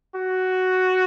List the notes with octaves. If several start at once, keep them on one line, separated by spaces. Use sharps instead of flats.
F#4